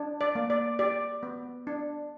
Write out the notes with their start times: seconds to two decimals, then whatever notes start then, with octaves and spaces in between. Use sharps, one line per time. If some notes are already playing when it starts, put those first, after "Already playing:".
Already playing: D4
0.21 D5
0.35 A#3
0.50 D5
0.79 G4 D5
1.23 B3
1.67 D4